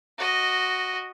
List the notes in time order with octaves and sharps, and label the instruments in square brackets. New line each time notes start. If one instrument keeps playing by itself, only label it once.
[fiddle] F#4 D#5